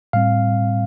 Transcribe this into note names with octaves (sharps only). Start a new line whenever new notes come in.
A2 G3 C4 F5